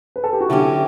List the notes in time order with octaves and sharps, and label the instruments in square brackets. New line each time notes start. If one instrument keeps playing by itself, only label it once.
[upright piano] B4
A4
G4
F#4
[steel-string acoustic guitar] D3 F#3 C#4 G4 [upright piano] E4